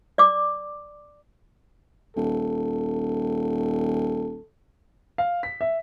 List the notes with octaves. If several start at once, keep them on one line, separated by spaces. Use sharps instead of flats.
D5 D6
D#1 A4
F5
B6
E5